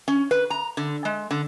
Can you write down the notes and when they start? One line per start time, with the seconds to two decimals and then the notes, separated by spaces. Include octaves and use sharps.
0.08 C#4
0.31 B4
0.50 A#5
0.77 D3
1.05 G#3
1.31 D3